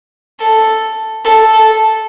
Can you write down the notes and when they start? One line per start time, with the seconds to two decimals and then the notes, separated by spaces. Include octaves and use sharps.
0.40 A4
1.25 A4
1.53 A4